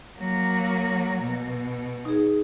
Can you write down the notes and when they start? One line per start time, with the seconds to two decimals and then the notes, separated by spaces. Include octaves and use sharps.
0.19 F#3 A#3
1.23 B2
2.05 D#4 G#4